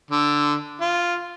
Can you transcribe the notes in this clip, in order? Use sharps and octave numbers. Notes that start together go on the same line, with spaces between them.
D3
F4